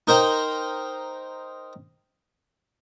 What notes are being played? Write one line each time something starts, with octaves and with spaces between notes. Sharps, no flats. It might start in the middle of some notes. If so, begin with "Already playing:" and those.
D#4 A#4 C5 G5